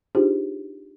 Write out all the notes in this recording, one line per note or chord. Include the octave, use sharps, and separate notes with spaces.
D4 D#4 F4 G4 G#4 C5